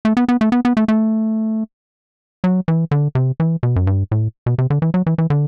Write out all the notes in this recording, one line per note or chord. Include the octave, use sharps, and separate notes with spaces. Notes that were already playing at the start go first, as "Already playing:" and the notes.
A3
B3
B3
A3
B3
B3
A3
A3
F#3
E3
D3
C3
E3
B2
F#2
G2
A2
B2
C3
D3
E3
F#3
E3
E3
D3